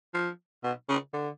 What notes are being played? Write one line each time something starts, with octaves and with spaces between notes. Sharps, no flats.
F3
B2
C#3
D3